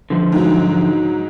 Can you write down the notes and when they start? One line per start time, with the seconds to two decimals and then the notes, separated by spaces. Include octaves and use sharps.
0.10 D3 F3
0.32 G#2 F#3